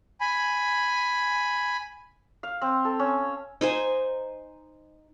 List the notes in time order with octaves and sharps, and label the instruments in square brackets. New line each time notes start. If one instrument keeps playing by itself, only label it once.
[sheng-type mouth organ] G#5 B5
[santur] F5
C4
A4
C#4
[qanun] D#4 C5 G#5